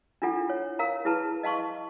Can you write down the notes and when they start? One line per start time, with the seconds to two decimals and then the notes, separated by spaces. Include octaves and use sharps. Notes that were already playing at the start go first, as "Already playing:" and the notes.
0.22 D4 E4 F4 A4 F#5
0.50 C#5
0.79 A#4 F5 A#5
1.05 E4 G#4 B4 A5 A#5
1.43 D#5 F5 A5 C6 C#6